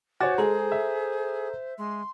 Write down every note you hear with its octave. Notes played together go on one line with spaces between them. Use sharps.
F#4 C5 C#5 G#5 D6 A6
G#3 G#4 A4 A#5
E5
G#3 C6